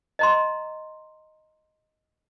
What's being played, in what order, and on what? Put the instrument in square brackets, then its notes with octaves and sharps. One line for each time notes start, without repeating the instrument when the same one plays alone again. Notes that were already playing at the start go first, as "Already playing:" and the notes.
[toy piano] D#5 A#5 C6